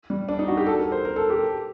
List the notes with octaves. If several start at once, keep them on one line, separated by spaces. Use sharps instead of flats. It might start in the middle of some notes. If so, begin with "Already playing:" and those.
G3
D4
D#4
F#4
G4
A4
A#4
C5
A#4
A4
G4